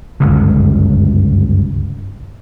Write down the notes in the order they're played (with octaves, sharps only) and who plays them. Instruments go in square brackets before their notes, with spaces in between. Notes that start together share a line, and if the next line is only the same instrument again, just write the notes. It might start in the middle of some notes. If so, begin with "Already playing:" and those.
[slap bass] G1 C#2 F#2 D3